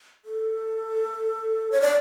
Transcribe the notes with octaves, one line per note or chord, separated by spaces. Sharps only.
A4
C#5
D5